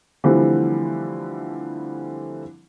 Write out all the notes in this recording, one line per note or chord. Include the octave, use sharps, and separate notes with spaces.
D3 E3 F3 G3 A3 C4